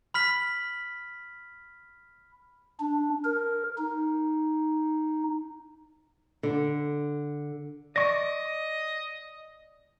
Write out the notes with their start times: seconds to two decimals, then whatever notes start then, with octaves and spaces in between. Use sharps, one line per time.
0.14 B5 F6 B6 F#7
2.80 D4
3.25 A#4
3.78 D#4
6.43 D3
7.96 D5 D#5 C#6 A#6